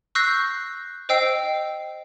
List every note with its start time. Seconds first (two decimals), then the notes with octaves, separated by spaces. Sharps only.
0.15 C#6 E6 F#6 G6 A#6 C7
1.09 C5 D#5 G5 E6 C7